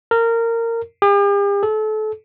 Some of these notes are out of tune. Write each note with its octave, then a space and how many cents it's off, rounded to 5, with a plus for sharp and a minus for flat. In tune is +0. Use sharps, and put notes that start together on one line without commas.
A#4 -20
G4 +45
A4 -30